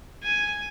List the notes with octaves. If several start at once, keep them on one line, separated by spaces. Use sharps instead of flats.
G#5